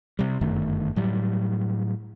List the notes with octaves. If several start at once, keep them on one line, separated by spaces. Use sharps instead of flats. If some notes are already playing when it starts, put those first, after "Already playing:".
C3 G3
G1 F#2 D#3 A3
A2 F#3 G3